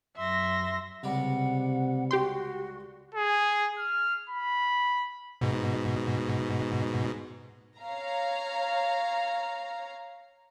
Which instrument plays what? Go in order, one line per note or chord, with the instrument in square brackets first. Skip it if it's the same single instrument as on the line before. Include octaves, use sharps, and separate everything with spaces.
[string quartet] F#2 C6 A#6 [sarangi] E5
[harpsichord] C#2 G3 [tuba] C3 [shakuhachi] F#5
[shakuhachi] F#4 [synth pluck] G4 G5 C6
[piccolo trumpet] G#4
F6
B5
[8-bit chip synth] G#2 B2
[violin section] C#5 F5 A#5